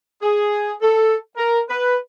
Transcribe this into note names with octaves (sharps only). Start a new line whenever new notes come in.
G#4
A4
A#4
B4